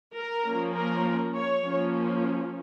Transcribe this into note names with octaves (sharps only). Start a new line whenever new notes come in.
A#4
F3 A#3 C#4
A#4
C#5
F3 A#3 C#4